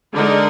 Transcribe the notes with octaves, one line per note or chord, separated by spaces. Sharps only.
D3 G#3 D#4 A#4 D5